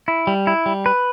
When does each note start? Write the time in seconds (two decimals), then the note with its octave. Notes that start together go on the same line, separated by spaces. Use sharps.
0.08 E4
0.27 G3
0.47 E4
0.66 G3
0.86 B4